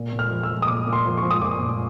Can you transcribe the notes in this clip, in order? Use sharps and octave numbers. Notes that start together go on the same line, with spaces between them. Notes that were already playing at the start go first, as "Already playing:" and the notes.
Already playing: A#2
A#2
F6
F3
E6
F3
D#6
A#2 D6
A#2
C6
F3
C#6
F3
D#6
A#2 D6
A#2